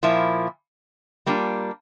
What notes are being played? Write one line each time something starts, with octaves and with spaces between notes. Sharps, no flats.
A#2 F3 A#3 E4
G3 A#3 D4 F4